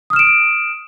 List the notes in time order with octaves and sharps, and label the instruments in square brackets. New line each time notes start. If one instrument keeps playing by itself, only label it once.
[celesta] D#6
F6
E7
D7